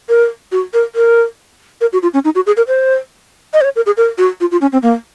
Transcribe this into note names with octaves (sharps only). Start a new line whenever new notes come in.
A#4
F#4
A#4
A#4
A#4
F#4
F4
C#4
D#4
F#4
G#4
A#4
C5
D#5
C5
C#5
A#4
G#4
A#4
F#4
F4
F4
C#4
C4
A#3